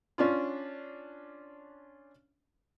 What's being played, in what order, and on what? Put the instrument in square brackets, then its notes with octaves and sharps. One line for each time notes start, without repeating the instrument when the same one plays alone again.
[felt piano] C#4 D4 F4